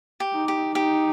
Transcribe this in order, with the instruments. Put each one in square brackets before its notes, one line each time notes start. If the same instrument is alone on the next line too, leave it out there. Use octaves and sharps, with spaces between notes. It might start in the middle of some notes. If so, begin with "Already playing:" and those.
[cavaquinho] G4
[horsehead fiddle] D#4
[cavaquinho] G4
[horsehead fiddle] D#4 [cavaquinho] G4